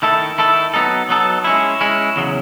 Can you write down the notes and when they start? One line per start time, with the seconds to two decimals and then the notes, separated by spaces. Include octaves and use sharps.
0.02 D#3 A3 E4 A4
0.38 D#3 A3 E4 A4
0.74 F#3 B3 D#4 A4
1.09 F#3 B3 D#4 A4
1.44 G#3 C#4 E4
1.81 G#3 C#4 E4
2.16 E2 C#3 F#3